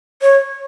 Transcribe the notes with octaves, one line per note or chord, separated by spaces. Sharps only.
C#5